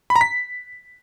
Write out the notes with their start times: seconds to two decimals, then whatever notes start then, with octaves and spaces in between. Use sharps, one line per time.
0.10 B5
0.16 A#5
0.21 B6